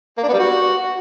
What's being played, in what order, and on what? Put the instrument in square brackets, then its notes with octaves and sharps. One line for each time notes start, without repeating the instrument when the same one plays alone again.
[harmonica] A#3
D4
B3
G3
F#4